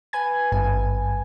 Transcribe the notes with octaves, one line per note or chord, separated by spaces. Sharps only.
B4 G#5 G#6
G#1 G2 G#5